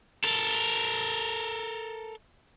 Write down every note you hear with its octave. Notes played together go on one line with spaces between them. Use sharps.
A4 A#4